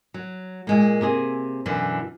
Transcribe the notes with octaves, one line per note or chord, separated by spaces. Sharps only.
F#3
A#2 G#3 A#3
C3 A#3 G#4
F#2 B2 D3 E3